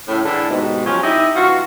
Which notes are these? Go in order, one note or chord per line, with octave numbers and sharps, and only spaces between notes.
A2 C#3
A2 D3 E3 D4 E4 G#4
D#2 G#2 B2
A#2 F3 F#3 C#4 F4 G4
C4 D#4 E4 G4 D#5 E5
G2 E3 F4 F#4